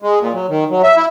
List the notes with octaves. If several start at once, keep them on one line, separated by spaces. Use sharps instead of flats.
G#3
A#2
F#3
D#3
F#3
E5
E4